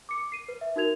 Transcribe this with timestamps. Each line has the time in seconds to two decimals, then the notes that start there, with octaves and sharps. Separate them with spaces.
0.09 D6 C#7
0.32 C7 D#7
0.48 B4
0.61 E5
0.76 D#4 F#4 A#4 G#6 F7